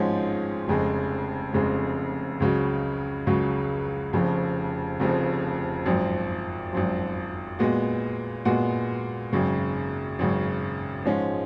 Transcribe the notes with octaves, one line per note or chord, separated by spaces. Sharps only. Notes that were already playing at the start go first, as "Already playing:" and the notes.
Already playing: G#1 G#2 F3 G#3 C#4
F1 F2 C#3 G#3
F1 F2 C#3 G#3
C#2 C#3 F#3
C#2 C#3 F#3
F1 F2 C#3 F3
F1 F2 C#3 F3
G#1 F#2 F3
G#1 F#2 F3
A#2 G#3 B3 F#4
A#2 G#3 B3 F#4
G#1 F#2 C#3
G#1 F#2 C#3
G#2 F3 G#3 C#4